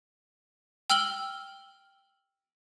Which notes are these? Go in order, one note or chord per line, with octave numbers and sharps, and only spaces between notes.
G5 E6 F6 F#7 G7